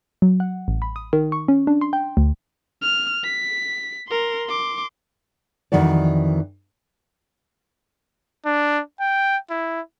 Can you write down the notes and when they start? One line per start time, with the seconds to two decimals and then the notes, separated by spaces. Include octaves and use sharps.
0.22 F#3
0.40 F#5
0.68 A1
0.82 B5
0.96 D#6
1.13 D#3
1.32 C#6
1.48 C#4
1.67 D4
1.81 C6
1.93 G5
2.17 D2
2.82 F6
3.24 B6
4.08 A#4 C6
4.48 C6 D6
5.72 F2 D#3 E3 F#4 D5
8.46 D4
9.00 G5
9.50 E4